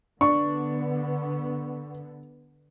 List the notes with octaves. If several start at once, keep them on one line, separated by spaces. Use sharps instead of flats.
D3 B3 D4 C#6